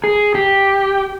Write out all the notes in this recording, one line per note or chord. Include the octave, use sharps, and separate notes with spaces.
G#4
G4